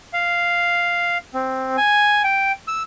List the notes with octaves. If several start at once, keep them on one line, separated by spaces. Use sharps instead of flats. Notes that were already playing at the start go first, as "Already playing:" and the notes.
F5
C4
G#5
G5
E6